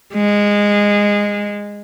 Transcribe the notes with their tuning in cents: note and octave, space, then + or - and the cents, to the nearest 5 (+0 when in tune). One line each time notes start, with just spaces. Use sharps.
G#3 -15